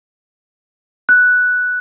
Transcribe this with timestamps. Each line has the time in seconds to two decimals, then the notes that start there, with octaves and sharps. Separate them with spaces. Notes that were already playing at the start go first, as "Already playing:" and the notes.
1.09 F#6